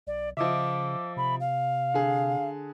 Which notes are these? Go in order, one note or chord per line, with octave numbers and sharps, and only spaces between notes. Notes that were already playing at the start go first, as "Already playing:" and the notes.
B1 D5
C#3 F3 D#5 E5 D6
C3 B5
F5
D3 G#4